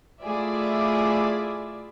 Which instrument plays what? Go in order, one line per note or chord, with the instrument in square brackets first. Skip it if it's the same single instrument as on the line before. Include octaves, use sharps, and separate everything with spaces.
[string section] A3 E4 F4 G#4 D5 E5